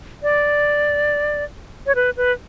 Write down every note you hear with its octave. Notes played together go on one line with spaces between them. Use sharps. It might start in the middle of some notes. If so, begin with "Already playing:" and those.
D5
C#5
B4
B4